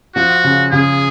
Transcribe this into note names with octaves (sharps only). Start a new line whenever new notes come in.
F3 F#4
C#3
C#3 G#4